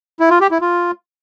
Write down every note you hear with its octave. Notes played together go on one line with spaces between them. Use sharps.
E4
F4
G4
E4
F4